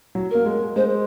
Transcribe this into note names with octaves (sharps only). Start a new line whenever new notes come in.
F#3
A#3 A#4
G#3
G#3 C5